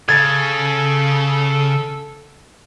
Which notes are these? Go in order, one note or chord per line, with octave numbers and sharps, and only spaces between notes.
C#3 A4 G#6 A6